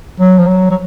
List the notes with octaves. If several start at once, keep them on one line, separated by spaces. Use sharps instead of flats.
F#3
F3
F#3
F#3